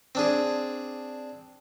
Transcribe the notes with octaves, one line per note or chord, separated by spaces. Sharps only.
C4 D4 G#4